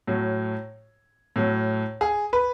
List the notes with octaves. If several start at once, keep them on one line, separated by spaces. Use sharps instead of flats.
A2 F#3
A2 F#3
G#4
B4